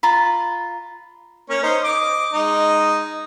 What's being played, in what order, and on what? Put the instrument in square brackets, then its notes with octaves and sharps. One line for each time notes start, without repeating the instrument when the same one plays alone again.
[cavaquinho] F4 A#5 B5
[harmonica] A#3 C#4 C#5
D#4 C5
D#5 D6
G#3 D#4